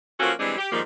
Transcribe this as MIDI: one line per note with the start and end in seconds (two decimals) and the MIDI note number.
0.20 0.32 53
0.20 0.32 58
0.20 0.32 61
0.20 0.32 66
0.20 0.32 69
0.39 0.55 52
0.39 0.55 55
0.39 0.55 56
0.39 0.55 60
0.39 0.55 62
0.58 0.72 67
0.72 0.81 44
0.72 0.81 51
0.72 0.81 53
0.72 0.81 55
0.72 0.81 58